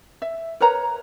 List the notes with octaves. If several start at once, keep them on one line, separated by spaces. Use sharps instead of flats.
E5
A#4 B4 C#5 A#5